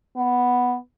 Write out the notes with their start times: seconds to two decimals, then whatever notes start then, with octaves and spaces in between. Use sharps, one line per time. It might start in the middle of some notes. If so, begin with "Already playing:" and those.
0.17 B3